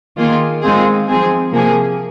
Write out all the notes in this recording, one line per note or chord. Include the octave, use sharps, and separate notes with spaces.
D#3 A#3 F4 G#4
D#3 G#3 C4 F4 G#4
F3 C4 G#4
C3 F3 A#3 G#4